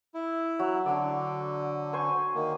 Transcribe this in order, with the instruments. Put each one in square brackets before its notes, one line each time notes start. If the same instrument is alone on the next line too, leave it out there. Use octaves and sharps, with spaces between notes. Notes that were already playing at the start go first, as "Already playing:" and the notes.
[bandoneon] E4
[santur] F#3
[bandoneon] D3 [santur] D4 D5
[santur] C5 G#5 C#6
[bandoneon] D#3 A#3